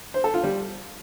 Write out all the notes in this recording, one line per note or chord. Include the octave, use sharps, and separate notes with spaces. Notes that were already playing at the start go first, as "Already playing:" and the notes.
C5
A4
F4
G3